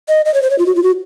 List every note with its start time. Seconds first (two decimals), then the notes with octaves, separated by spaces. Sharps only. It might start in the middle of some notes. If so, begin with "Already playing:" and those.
0.09 D#5
0.25 D#5
0.34 C#5
0.42 C5
0.50 C#5
0.59 F4
0.66 F#4
0.75 F4
0.83 F#4